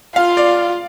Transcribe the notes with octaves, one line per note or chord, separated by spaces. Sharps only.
F4 F5
D5